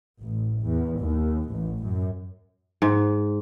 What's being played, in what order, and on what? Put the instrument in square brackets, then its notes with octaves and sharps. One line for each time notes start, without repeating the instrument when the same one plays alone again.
[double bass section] A1
E2
D#2
A1
F#2
[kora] G#2